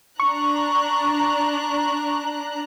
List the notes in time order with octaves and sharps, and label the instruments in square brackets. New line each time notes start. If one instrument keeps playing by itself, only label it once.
[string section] D4 A#5 F#6 [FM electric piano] C#6